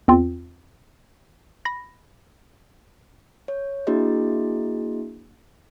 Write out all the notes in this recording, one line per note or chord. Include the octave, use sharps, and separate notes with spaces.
E2 C4 F4
B5 A#6
C#5
A#3 D4 E4 F#4 G#4 D#5